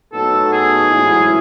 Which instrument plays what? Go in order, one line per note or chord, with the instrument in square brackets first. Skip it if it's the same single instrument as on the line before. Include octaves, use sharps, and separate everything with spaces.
[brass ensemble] A2 F#3 B3 D#4 [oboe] A4
[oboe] G#4
[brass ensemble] A1 G#2 F#3 C#4 E4